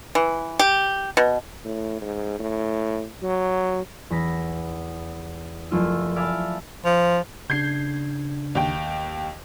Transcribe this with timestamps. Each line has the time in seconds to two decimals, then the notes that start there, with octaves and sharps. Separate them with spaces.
0.15 E3
0.59 G4
1.17 B2
1.65 A2
2.01 G#2
2.39 A2
3.23 F#3
4.10 E2 B5 A#6 B6
5.71 F#1 F3 A3 E4 F4 E6
6.16 D5 E5 F5 G#5 A5 B5
6.85 F3
7.50 C#3 D4 G6 G#6 C7
8.55 D#2 G5